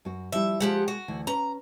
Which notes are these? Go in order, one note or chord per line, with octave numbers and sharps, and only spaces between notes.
F#2 F#4
F3 G3 E4 E5
F3 G#3 A#3 G4 F#5
F#4
D2 E3
C#4 B4 A#5